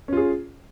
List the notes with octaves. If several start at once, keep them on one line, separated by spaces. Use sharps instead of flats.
C#4 F4 G#4